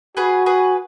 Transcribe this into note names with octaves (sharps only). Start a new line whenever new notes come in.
F#4 G#4 B4
G#4 B4